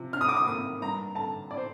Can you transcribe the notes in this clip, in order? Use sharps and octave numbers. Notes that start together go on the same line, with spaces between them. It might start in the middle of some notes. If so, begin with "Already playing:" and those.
Already playing: C3 F3
D4 F6
D#6
D6
D#6
A#3 D#6
G2 A#5
D3 A5
D5
C5